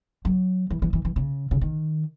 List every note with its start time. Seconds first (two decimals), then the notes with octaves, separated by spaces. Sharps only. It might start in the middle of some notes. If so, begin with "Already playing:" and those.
0.25 F#3
0.70 E3
0.82 E3
0.93 E3
1.05 E3
1.16 C#3
1.51 C#3
1.61 D#3